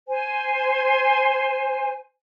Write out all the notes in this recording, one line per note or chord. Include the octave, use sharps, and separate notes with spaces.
C5 G#5